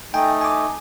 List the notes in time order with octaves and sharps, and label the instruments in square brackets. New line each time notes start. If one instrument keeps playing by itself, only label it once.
[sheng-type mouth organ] A3 D#4 [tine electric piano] G5 G#5
[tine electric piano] G#5 D6